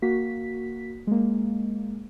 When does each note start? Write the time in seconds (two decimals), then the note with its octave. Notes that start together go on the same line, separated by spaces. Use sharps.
0.02 A#3 F#4 B6
1.07 G#3 A#3